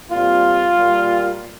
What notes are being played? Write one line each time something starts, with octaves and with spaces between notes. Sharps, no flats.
A#2 G3 C4 F4
A#2 G3 A#3